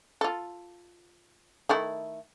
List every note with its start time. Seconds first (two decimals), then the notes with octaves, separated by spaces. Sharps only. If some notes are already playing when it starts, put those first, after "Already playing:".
0.21 F4 A4
1.69 D#3 A3 E4